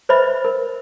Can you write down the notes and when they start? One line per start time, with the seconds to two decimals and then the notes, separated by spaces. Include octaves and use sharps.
0.09 B4 C5 D#5 E5 B5
0.45 A#4